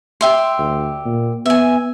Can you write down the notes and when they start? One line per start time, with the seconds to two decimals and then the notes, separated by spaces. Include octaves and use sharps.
0.21 G4 E5 C6
0.58 D2
1.05 A#2
1.46 B3 E5 G#5